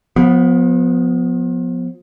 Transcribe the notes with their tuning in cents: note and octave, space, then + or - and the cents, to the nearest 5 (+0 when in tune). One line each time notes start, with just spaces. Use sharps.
F3 +35 B3 +0